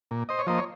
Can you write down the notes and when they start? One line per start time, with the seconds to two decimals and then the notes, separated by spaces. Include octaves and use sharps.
0.11 A#2
0.29 C5 D#5
0.39 C#5
0.47 F3 A#3 C5 D#5
0.58 C#5